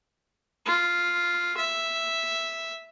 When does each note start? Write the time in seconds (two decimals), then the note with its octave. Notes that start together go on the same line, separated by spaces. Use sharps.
0.66 F4
1.57 E5